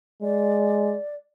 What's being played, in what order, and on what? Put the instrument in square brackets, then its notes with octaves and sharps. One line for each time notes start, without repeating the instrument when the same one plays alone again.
[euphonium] G#3 [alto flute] D5